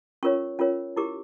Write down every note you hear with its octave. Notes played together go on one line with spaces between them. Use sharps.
C#4 F4 A#4 C#5 C#6
C#4 F4 A#4 C#5
E4 G4 A#4 D6